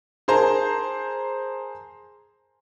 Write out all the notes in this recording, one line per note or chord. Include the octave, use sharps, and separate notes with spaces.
G#4 A#4 C5 A5 A#5